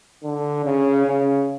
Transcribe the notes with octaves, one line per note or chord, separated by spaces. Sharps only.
D3
C#3
C#3